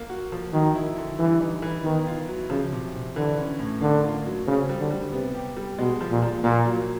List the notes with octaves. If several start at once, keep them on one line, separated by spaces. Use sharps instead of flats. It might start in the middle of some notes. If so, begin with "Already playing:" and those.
Already playing: A#3
F#4
F3
D#3 F#3
E4
D3
E3 G3
D#4
E3
D#3 B3
F4
F#3
C#3 F3
C3
C3
D3 E3
C#4
A2
D3 A#3
F4
F#3
C#3 C4
G3
D3
G3
C3 B3
G4
G3
B2 G#3
F3
A#2
F3
A#2 A#3
F#3